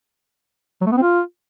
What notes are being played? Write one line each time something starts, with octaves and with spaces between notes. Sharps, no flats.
F#3
A3
B3
C4
F4